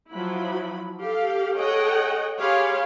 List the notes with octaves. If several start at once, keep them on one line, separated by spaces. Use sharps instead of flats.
F3 F#3 E4 B5
G4 A4 F5
G#4 A4 C#5 D#5 F#5 G5
G4 G#4 C#5 F5 B5 C6